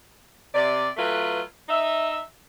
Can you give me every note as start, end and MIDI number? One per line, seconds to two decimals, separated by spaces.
0.54 0.89 48
0.54 0.89 74
0.97 1.40 54
0.97 1.40 57
0.97 1.40 65
0.97 1.40 71
1.69 2.18 63
1.69 2.18 76